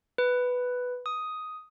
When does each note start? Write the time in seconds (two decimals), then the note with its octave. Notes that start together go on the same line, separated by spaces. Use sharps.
0.18 B4
1.06 D#6